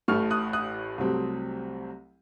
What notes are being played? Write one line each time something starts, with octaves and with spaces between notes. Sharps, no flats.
A1 A2 A3 C#6 F6
D#6 F#6
D#6 F#6
C2 C3 F#3 A3 C4